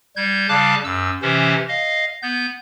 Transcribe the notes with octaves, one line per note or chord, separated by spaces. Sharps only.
G3 G6 G#6
C#3 G3 F5 A5 D6 F#6
F#2 E6
C3 E3 C#4 C5
D#5 F5
B3 G6